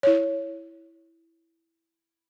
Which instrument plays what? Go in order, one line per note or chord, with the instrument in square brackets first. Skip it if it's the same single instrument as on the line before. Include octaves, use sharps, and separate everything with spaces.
[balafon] E4 C#5